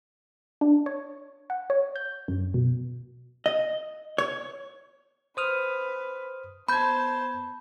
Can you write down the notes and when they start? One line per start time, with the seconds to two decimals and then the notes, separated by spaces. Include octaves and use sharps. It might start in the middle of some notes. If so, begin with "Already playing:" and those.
0.61 D4
0.86 C#5
1.50 F#5
1.70 C#5
1.96 G6
2.28 F#2
2.54 B2
3.46 D#5
4.18 C#5
5.37 B4 C5 D#6 F6
6.69 B3 C5 A5 B5 G6 G#6